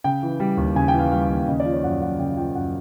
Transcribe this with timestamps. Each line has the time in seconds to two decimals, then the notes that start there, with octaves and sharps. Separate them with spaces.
0.04 C#3 G5
0.23 E3
0.40 G3
0.57 D#2
0.75 C#3 G#5
0.88 G5
0.94 E3
0.99 F5
1.11 G3 F5
1.29 D#2
1.47 C#3 D#5
1.60 D5
1.65 F3
1.71 C#5
1.84 F#2 F#5
2.02 F#2 F#5
2.19 C#3 G5
2.37 F3 G5
2.55 F#2 F#5